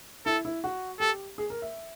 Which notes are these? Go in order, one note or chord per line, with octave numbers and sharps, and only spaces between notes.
E4 A4
E4
F#4
G4 A4
G#4
A#4
E5